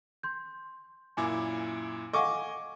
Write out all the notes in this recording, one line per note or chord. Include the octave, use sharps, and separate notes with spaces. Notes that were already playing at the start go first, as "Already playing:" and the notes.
C6 G6
F#2 A#2 E4 G#5 D6
A4 D#5 F5 F#5 G#5 C#6 D6